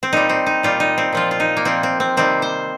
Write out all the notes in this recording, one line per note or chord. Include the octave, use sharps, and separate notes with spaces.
C4
A#2 G3 D#4
C4
D#4
A#2 G3 F4
D#4
C4
A#2 F3 F4
F4
D#4
A#3
A#2 F3 C4
C4
C4
C3 D#3 G3 C4
C5